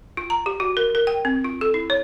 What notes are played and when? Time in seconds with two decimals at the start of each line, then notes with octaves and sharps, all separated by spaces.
0.17 F4
0.30 A#5
0.46 G4
0.60 F#4
0.77 A#4
0.95 A#4
1.07 G5
1.25 C4
1.44 F4
1.61 A4
1.74 E4
1.90 C#5